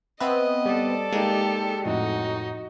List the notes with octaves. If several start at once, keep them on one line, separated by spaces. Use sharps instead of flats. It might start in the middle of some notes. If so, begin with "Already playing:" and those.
B3 C4 B4 D#5 E5
G3 G4 A4 D5
G#3 A#3 D#4 G4
F2 A2 D#4 F#4 F#5